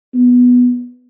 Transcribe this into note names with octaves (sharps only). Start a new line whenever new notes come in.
B3